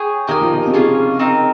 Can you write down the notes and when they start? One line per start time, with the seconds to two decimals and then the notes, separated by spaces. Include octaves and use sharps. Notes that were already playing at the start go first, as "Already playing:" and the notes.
Already playing: G#4 C#5 G5
0.28 D#3 G4 A#4 D#5 G#5
0.42 F3
0.54 D#3
0.67 C3
0.73 C#3 A#3 C#4 F4 G#4
1.19 C4 D#4 A#4